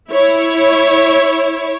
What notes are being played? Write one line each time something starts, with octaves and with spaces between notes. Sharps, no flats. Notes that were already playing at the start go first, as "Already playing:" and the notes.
E4 C#5